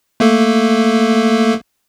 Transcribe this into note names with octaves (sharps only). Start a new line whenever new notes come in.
A3 A#3 A4